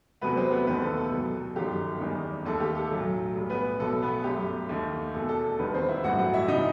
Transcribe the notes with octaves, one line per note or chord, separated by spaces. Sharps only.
E2 C3 F#3 A3 B3 B4
C4 C5
B3 B4
E1 D#2 D#3 A3 B3 B4
A4
A4
C2 B2 F#3
G1 F#2 D#3 G4
F#1 E2 D#3 G3
D#2 D#3 A3 A4
G4
A4
B1 A2 F#3
B1 A2 G3
B3 B4
B1 B2 A3 A4
B3 B4
G1 F#2 F#3 A3 G4
D#2 D#3 A3
E2 B2 A3 A4
A4
A4
E1 D#2 D#3 G3 B3 B4
C4 C5
E4 E5
A1 G2 F#3 A3 F#4 F#5
F#4 F#5
E4 E5
C3 E3 G3 D#4 D#5